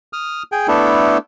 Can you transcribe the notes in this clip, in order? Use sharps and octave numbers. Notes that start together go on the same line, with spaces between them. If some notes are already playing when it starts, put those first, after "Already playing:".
D#6 F6
G#4 G5 G#5
A3 B3 D4 E4 A4